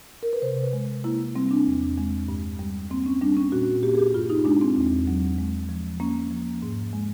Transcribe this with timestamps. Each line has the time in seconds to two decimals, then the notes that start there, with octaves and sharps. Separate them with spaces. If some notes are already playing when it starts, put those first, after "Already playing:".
0.23 A#4
0.33 B4
0.42 C3 C5
0.64 B4
0.73 G#3
1.04 A#3 E4
1.35 G3 C4
1.51 D4
1.67 E2
1.98 G#3
2.29 G2
2.59 G3
2.90 A#3 C4
3.06 C#4
3.21 G3 D4
3.37 C#4
3.52 A#2 F#4
3.83 A#3 G4
3.95 G#4
3.99 G4
4.14 G2 F4
4.30 D#4
4.45 G#3 D4
4.61 C4
4.76 E2
5.07 F#3
5.38 G#3
5.69 F3
6.00 A#3 C#4
6.30 F3
6.62 G#2
6.93 G#3